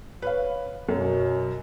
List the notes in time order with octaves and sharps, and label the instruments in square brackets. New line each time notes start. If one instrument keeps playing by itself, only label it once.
[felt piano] B4 C#5 F5
[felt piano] F#2 [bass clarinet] B2 [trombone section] F#3 C#4 A#4